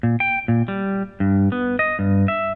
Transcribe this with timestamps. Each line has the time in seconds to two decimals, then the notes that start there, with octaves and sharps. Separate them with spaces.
0.03 A#2
0.20 G5
0.48 A#2
0.68 G3
1.20 G2
1.52 B3
1.79 D#5
1.99 G2
2.28 E5